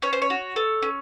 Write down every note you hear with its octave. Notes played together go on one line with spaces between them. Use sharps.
C#4 C#5
C5
C#5
F#4
A4
C#4